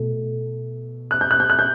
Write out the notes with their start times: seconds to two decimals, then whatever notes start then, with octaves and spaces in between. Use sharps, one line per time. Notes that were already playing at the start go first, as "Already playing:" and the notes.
Already playing: B2 A3
1.11 F#6
1.21 G6
1.31 F#6
1.40 G6
1.50 F#6
1.59 G6